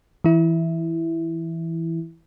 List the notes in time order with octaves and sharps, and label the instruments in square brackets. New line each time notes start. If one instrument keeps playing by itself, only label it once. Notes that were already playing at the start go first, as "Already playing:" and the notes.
[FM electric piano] E3 E4